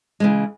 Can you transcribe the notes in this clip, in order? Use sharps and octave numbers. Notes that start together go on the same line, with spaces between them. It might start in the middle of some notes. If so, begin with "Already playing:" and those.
C#3 E3 G#3